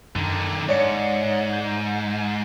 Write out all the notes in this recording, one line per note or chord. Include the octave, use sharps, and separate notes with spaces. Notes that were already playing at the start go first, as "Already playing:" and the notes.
F#2 D3 D#3
G#2 C#5 D5 C#7
G6